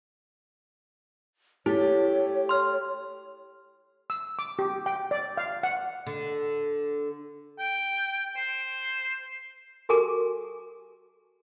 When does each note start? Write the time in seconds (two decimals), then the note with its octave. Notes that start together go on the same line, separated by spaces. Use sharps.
1.66 A3 E4 G4 C#5
2.49 C6 F6
4.10 E6
4.39 D6
4.59 G4
4.86 G5
5.11 D5
5.37 F5
5.63 F#5
6.07 D3
7.59 G5
8.36 C5
9.89 F#4 G4 A4 A#4 G#5 D6